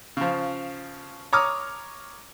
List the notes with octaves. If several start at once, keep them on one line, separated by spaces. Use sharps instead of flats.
C#3 F3
C#5 A#5 D6 D#6 F6